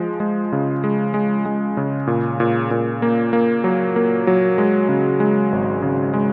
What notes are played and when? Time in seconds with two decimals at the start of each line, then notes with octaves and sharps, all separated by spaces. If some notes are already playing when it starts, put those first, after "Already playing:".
Already playing: F3 G#3
0.20 G#3
0.52 C#3
0.84 G#3
1.14 G#3
1.45 G#3
1.77 C#3
2.07 A#2
2.40 A#2
2.71 A#2
3.02 A#3
3.33 A#3
3.64 F#3
3.96 A#3
4.27 F#3
4.58 G#3
4.89 C#3
5.20 G#3
5.52 G#1
5.82 C#3
6.14 G#3